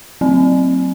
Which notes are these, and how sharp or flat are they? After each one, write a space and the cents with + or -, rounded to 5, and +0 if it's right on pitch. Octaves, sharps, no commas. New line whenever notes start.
F#3 +0 C4 +0